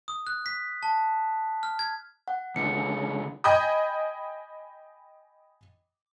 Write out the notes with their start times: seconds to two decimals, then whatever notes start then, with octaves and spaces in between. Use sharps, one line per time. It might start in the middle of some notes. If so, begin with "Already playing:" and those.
0.08 D#6
0.27 F#6
0.46 B6
0.83 A5
1.63 F6
1.79 G#6
2.28 F#5
2.56 C#2 D3 C#7
3.44 D#5 G5 G#5 B5 D#6